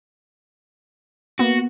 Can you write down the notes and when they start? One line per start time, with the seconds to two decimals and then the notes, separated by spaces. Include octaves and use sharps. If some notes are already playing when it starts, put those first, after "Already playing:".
1.39 A#3 B3 F#4